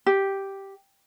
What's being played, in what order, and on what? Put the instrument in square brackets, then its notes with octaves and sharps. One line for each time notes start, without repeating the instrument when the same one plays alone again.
[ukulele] G4